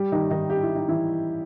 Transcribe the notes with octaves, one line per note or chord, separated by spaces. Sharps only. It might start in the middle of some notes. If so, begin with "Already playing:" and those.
Already playing: G3 G4
D#3 D#4
D#3 D#4
G4
E4
D#4
E3 E4